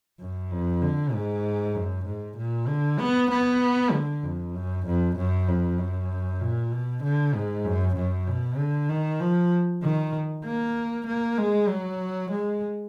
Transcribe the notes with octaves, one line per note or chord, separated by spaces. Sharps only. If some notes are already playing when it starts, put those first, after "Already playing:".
F#2
F2
D3
G#2
F#2
G#2
A#2
D3
B3
B3
D3
F2
F#2
F2
F#2
F2
F#2
A#2
B2
D3
G#2
F#2
F#2
B2
D3
D#3
F3
D#3
A#3
A#3
G#3
F#3
G#3